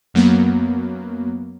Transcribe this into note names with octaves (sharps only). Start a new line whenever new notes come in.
F#2 F#3 A#3 B3